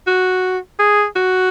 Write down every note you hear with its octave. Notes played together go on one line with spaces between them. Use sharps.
F#4
G#4
F#4